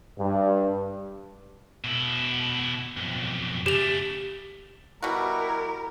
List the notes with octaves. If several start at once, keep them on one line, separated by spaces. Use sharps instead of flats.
G2
B2 E4
B1 F2
C#3 A3 G4 F7
B2 G3 E4 F#4 A#4